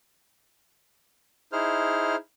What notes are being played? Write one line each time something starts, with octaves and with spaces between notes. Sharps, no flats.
D#4 E4 G#4 C5 F6